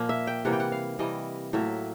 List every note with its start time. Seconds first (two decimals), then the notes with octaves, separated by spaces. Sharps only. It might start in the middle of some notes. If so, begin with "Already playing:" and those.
Already playing: A#2 F3 A#3
0.09 E5
0.27 G5
0.45 C3 E3 G3 A#3 F#5
0.53 G5
0.60 F#5
0.72 F5
0.99 C3 E3 G3 A#3 D#5
1.53 A2 F#3 A#3 E5